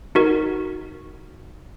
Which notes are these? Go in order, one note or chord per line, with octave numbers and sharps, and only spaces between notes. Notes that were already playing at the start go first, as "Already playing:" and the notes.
D#4 F#4 A#4